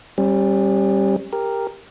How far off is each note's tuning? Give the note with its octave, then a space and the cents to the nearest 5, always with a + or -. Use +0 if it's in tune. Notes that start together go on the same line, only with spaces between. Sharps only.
G3 +0 C#4 -45
G4 +15 A#4 +0